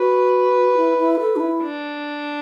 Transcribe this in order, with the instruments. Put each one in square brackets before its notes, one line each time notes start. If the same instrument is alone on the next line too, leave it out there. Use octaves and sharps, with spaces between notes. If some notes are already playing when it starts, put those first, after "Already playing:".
Already playing: [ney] F#4 [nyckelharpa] B4
[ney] E4
E4
A4
D4
E4
[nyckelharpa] D4